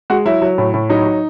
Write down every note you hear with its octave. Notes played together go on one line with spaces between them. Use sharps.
G#3 F#4
F#3 E4
F#3
A2
A2
F#3 D#4
F#3